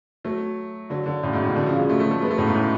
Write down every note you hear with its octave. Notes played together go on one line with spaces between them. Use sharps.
F#3 A3
D3 F#3
D3 F#3
A2 C#3
G#2 B2
A2 C#3
B2 D3
C#3 F3
F3 G#3
F#3 A3
F#3 A3
F#3 A3
G#3 B3
F#3 A3
A2 C#3
G#2 B2
A2